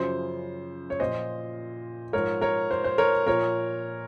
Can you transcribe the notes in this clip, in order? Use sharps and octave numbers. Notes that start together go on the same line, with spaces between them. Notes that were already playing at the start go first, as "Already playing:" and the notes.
Already playing: F#2 C#3 F3 C5
C#5
A#2 F3 C5 D#5
G#2 F3 A#4 C#5
A#4 C#5
C5
C5
A#4 C#5
A#2 F3 A#4 C#5